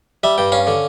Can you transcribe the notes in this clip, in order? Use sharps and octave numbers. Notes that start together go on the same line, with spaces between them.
G3 E5
G2 G5
C#4 F5
D3